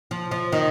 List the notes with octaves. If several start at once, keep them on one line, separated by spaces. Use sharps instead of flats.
F3
F3
D#3